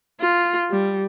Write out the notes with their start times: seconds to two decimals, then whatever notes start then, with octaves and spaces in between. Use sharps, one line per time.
0.21 F4
0.71 G3